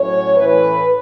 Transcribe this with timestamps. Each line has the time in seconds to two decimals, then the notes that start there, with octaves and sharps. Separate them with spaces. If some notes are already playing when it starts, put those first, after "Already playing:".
Already playing: A2 F#3 C#4 C#5
0.35 A2 E3 A3 C#4 B4